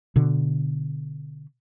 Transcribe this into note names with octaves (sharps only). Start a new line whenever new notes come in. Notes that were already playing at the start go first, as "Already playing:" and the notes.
B2 D3